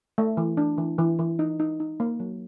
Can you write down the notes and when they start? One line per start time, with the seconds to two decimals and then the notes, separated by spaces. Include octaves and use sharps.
0.18 A3
0.37 E3
0.57 D4
0.78 E3
0.99 E3
1.19 E3
1.39 D#4
1.59 D#4
1.80 D#4
2.00 A#3
2.20 F#3